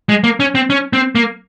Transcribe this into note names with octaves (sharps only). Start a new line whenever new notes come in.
G#3
A#3
C#4
C4
C#4
C4
A#3